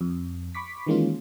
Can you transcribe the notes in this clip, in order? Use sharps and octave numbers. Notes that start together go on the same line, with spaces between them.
F2
B5 C#6 D6 B6
D#3 E3 G#3 A#3 C#4 F4